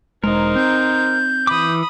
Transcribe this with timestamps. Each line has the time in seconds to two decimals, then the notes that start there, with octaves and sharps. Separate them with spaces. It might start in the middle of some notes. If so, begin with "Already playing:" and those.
0.24 E1 G#3 D#4 A#4 C5
0.56 C4 G6
1.47 E3 B5 D6 D#6